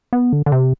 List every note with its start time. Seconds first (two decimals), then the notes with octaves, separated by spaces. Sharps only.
0.13 B3
0.33 D3
0.46 D3
0.52 C3